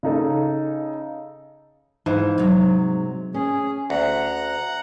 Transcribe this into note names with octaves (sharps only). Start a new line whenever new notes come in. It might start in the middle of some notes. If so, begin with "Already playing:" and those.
C#3 D#4 A4
G#2 E3 E4 F5
C3 F#3
C#4 G#4
D2 F#5 A#5 F#6